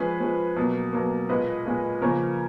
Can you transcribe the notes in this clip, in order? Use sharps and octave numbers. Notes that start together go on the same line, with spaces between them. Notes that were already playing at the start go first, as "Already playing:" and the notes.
Already playing: F3 G#3 C#4 G#4 B4
F3 G#3 C#4
B2 F#3 A#3
B2 F#3 A#3
A#2 G#3 C#4 B4 D#5
A#2 G#3 C#4
C#3 F3 A#3 C#4 A#4 C#5